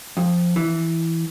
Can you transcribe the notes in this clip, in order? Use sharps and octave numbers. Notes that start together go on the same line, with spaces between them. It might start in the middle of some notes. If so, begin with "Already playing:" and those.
F2
E3